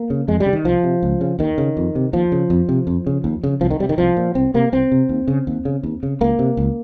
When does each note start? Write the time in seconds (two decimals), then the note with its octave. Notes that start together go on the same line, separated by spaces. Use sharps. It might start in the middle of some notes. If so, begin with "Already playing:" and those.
Already playing: A#3
0.10 C#3
0.28 F2 G#3
0.40 G3
0.46 C#3
0.53 D#3
0.64 C2 F3
0.84 C3
1.03 C#2
1.21 C#3
1.39 D#2 D#3
1.58 C#3
1.77 F2
1.95 C3
2.13 D#2 F3
2.32 C#3
2.50 F2
2.69 C3
2.87 F2
3.07 C#3
3.24 D#2
3.44 C#3
3.61 C2 F3
3.71 D#3
3.80 C3 G3
3.89 D#3
3.98 C2 F3
4.17 A#2
4.35 C2 C4
4.54 C3 A#3
4.72 C2 C4
4.92 C3
5.09 D#2
5.28 C#3
5.47 D#2
5.65 C#3
5.83 D#2
6.03 C#3
6.21 C#2 A#3
6.39 C3
6.57 C#2